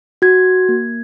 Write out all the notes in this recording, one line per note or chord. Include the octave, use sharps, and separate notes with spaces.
F#4 G#6
A#3